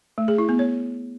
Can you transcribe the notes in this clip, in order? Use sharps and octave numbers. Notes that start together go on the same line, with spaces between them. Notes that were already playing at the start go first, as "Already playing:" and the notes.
A3
G#4
E4
B3
C#5